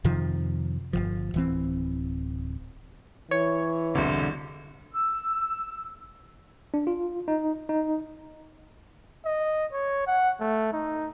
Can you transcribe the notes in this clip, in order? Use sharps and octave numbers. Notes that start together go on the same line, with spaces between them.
F2 C3 D#3 F3
G1 C2 F3
D1 E3 C4
E3 C#5
E1 C2 D3
E6
D4
F4
D#4
D#4
D#5
C#5
F#5
A3
D#4